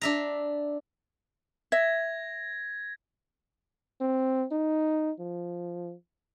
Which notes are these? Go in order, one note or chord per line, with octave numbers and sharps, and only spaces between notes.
D4 E5 A#5
E5 G#6 A#6
C4
D#4
F3